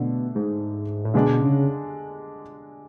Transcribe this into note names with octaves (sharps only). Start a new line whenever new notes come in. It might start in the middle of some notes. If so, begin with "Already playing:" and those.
Already playing: B2 D3 A3 D4
G#2
A2
B2 D3 G#3 D4
C#3